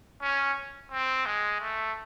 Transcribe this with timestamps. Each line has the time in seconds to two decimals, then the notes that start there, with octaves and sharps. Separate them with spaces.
0.21 C#4
0.91 C4
1.26 G#3
1.61 A3